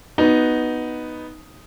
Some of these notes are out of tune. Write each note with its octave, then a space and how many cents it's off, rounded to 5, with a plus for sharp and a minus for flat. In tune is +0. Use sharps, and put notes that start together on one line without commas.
B3 +0 D#4 +0 F#4 +0